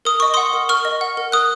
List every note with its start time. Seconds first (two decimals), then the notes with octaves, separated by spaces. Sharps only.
0.05 A#4 D#6
0.20 D#5 C#6
0.34 F#5 C6 D#6
0.53 A#4
0.69 A#4 C#6 F6
0.85 D#5
1.01 F#5
1.17 A#4
1.32 A#4 D#6 F#6